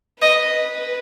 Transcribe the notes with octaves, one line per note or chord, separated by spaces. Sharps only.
B4 D#5